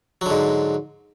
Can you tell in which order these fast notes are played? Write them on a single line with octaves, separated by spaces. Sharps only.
F#3 D3 G#2